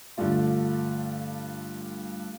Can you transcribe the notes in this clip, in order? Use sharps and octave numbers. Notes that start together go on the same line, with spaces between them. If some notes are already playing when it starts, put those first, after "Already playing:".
G2 D3 G3 A3 D4 F4